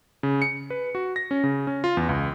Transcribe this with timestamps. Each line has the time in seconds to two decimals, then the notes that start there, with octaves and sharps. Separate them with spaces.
0.23 C#3
0.42 C#7
0.70 B4
0.95 F#4
1.16 A#6
1.31 C#4
1.44 C#3
1.67 C#4
1.84 F4
1.97 E2
2.09 C#2